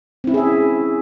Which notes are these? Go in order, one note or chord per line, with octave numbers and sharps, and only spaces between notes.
C4 C#4 E4 G#4 E5